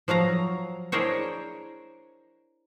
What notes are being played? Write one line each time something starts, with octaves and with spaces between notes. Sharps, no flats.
F3 F#3 F5 A#5
D4 E4 G#4 A#4 C5 C#5